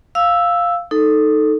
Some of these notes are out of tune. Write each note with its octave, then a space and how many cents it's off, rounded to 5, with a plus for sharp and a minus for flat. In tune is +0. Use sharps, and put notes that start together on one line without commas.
F5 +0 E6 +0
D#4 +0 A4 +0